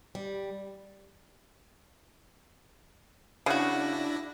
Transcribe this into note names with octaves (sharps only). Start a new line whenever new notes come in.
G3
C#3 D4 E4 F#4 A#6